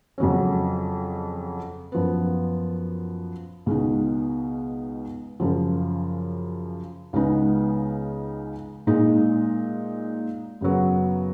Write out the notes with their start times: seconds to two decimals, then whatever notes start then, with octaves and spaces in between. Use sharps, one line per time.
0.18 F2 C#3 F#3 C#4
1.92 F#2 F3 B3
3.66 C#2 B2 G#3 D#4
5.40 F#2 C#3 F3
7.13 C#2 C#3 G#3 B3 D#4
8.87 A#2 G#3 D#4
10.61 F#2 C#3 F#3 B3